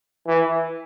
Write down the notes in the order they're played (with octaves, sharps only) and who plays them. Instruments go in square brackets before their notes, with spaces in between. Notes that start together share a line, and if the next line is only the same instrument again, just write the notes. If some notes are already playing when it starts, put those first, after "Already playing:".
[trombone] E3